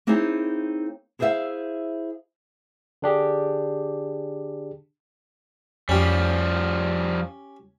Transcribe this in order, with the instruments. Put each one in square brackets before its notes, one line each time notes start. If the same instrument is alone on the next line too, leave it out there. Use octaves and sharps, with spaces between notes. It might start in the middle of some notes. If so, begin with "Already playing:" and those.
[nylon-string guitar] A#3 C4 D#4 E4 G#4 C#5
E4 G#4 C5 D5 E5 F5
[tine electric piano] D3 D4 G4 G#4
[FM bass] F2 [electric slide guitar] F3 G3 [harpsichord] C#4 G4